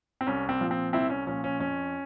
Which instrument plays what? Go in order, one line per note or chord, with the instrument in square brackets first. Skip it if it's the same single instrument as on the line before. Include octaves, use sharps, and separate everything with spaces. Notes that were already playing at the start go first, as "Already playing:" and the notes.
[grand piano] C4
C2 C#4
C4
A#2 F3
C4
C2 C4 E4
C#4
A#2 F3 C#4
C#4
F2 C#4